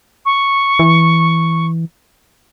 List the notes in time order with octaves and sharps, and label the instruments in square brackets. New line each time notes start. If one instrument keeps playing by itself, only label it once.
[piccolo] C#6
[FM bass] E3